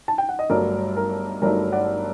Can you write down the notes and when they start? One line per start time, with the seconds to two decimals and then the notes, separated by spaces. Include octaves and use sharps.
0.08 A5
0.18 G5
0.29 F#5
0.39 D#5
0.50 G1 G2 F#3 A3 A#4 D5
0.97 A#4
1.42 G1 G2 F#3 A3 A#4 D5
1.72 D5 F#5